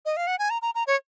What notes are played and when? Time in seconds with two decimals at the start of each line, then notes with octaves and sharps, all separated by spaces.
0.05 D#5
0.17 F5
0.27 F#5
0.39 G#5
0.50 A#5
0.62 A#5
0.75 A#5
0.87 C#5